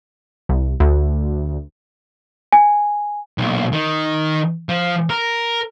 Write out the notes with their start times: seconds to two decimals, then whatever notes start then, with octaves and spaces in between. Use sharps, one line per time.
0.49 C2
0.80 D2
2.52 G#5
3.38 B1 A#2
3.73 D#3
4.69 F3
5.10 A#4